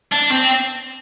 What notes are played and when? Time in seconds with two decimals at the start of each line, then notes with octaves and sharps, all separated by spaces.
0.12 D4
0.32 C4